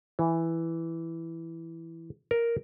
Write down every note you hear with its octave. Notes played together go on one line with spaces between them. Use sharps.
E3
A#4